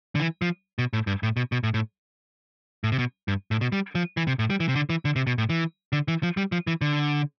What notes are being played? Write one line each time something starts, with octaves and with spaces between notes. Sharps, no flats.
D3
E3
F3
B2
A2
G2
A2
B2
B2
A2
A2
A2
C3
B2
G2
A2
B2
G3
F3
E3
C3
A2
G3
E3
C3
D3
E3
D3
C3
B2
A2
E3
D3
E3
F3
G3
F3
E3
D3